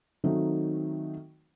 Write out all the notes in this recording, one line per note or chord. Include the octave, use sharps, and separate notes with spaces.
D#3 F#3 A3 C4 D#4